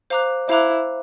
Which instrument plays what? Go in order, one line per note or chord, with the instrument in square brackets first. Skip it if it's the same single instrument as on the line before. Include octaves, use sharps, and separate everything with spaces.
[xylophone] C5 F5 A#5 D6 F#6
[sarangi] E4 [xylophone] C5 F5 A#5 D6 F#6